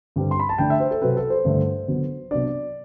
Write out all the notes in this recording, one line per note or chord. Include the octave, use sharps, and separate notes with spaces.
G2 D3 G3 C4
C6
B5
A5
D3 A3 D4 G5
E5
C5
A4
C3 F#3 C4 B4
A4
C5
G2 D3 A3
D3 F#3 B3
C3 F#3 B3 D4 D5